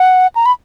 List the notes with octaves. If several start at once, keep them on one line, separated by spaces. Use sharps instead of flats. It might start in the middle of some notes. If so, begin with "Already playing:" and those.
Already playing: F#5
A#5
B5